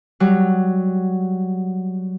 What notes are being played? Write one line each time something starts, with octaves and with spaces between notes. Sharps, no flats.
F#3 G3